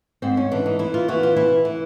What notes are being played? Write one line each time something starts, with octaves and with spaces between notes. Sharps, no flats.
G#2 C4
C#4
E3 D4
D#4
E3 E4
F4
E3 F#4
F4
E3 E4
E3